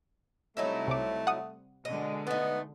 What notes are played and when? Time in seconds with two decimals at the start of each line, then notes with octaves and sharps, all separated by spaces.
0.57 C3 F#3 G3 A3 D#4 E4
0.88 C2 D6
1.27 F#5 D#6
1.85 B2 D3 G#3 D#5
2.27 A3 B3 D#4